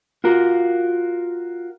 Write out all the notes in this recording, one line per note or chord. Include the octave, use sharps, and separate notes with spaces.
F4 F#4 A#4